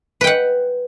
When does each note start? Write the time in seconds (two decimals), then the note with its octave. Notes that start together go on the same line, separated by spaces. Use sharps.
0.21 B4
0.24 G5
0.27 F#5